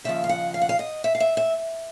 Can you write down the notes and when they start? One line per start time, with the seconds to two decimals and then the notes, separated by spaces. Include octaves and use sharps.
0.04 D#2 C#3 F3 E5
0.24 F5
0.29 F#5
0.54 F5
0.62 F#5
0.69 F5
0.79 D#5
1.04 E5
1.15 F5
1.20 E5
1.37 E5